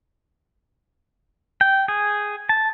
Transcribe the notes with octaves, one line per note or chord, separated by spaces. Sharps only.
G5
G#4
A5